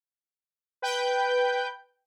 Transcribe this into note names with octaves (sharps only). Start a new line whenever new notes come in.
B4 G5 G6